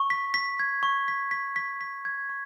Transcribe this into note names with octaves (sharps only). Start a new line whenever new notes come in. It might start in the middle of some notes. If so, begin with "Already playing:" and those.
Already playing: C#6
B6
B6
G#6
C#6
B6
B6
B6
B6
G#6
C#6